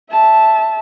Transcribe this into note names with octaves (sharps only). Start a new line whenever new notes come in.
E5 A5